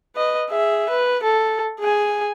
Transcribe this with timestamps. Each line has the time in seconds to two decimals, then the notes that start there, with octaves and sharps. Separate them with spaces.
0.16 B4 D#5
0.50 G#4 E5
0.90 B4
1.23 A4
1.80 G#4 G#5